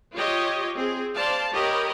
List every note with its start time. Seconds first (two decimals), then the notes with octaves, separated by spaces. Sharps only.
0.14 F4 G4 C#5 D#5
0.75 C4 G#4
1.14 C5 D5 F5 A5
1.52 G4 A#4 C#5 D#5 B5